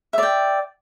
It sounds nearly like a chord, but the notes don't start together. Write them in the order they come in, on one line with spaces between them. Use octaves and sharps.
E5 D5 G5